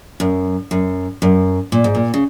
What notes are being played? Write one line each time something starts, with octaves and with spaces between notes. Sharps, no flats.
F#2
F#2
F#2
A#2
G#2
A#2
C#3